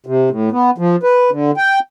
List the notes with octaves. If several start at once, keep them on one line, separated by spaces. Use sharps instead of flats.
C3
A2
B3
F3
B4
D3
G5